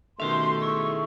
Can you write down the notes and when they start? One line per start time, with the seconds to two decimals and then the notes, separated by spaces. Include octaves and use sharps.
0.20 B2 D#3 A3 C#4 F#4 G4 E5 C6
0.60 E4 G#4 C#6 E6